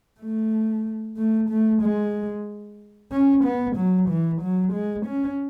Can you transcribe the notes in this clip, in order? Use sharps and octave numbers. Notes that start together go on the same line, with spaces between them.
A3
A3
A3
G#3
C#4
B3
F#3
E3
F#3
G#3
C#4